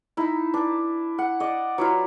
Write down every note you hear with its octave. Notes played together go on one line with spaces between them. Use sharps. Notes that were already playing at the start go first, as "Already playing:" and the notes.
D#4 E4
D4
F#5
D5 D#5
F#3 E4 F4